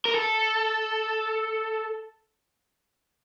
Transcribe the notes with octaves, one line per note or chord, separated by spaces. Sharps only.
A#4
A4